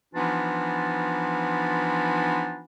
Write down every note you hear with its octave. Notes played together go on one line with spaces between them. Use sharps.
E3 F3 B3 D4 D#4 F4